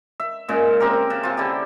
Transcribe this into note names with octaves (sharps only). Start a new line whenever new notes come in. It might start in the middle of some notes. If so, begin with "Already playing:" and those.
E5
A#2 C#3 G#3
C4 G4 A#4
C#3
C3 F4
D3 E4 G4